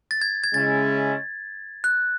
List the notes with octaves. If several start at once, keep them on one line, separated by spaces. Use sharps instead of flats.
A6
G#6
G#6
C#3 G#3 C#4 E4 A6
F#6